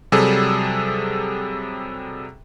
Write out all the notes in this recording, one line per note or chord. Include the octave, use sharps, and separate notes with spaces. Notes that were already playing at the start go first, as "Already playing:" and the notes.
C3 F#3 G3 G#4 A4